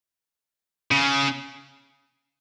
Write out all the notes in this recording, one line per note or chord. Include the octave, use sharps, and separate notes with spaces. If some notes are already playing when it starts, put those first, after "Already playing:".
C#3